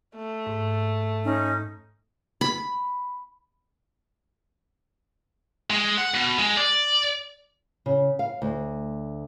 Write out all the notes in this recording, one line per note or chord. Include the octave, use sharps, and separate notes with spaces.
A3
G#2
C#4 D#4
B5
G#3
F#5
B2
G#3
D5
C#3
F5
D2